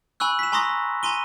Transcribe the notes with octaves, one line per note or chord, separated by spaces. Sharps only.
G#5 B5 C#6 E6 F#6
B6 E7
G#5 A#5 C6 C#6 D#6 A#6
G#5 A#5 C6 D#7 G7